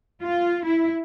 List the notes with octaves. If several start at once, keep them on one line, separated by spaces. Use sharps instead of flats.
F4
E4